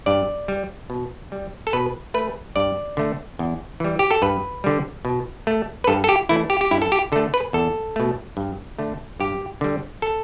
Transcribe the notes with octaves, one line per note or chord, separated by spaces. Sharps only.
G2 D5
G3
B2
G3
A4
B2 B4
A3 B4
G2 D5
D3 A3
E2
E3 G3
G4
A4
G2 B4
D3 G3
B2
A3
B4
G2 A4
A4
G4
E3 A3 E4
G4
G4
G2 E4
A4
G4
D3 A3 A4
B4
E2 A4
B2 A3
G2
D3 A3
G2 G4
D3 G3
A4